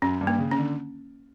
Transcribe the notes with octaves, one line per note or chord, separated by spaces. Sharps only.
F#2 C#4
G2
A#3
C#3
C#4
D3